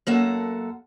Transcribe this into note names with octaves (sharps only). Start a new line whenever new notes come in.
F#2 A#3 A4 F#5